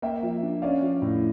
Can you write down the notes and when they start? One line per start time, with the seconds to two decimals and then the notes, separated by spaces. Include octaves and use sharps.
0.02 A#3 E5 G5
0.23 F3
0.43 D4
0.62 C#4 D5 F5
0.82 F3
1.02 A2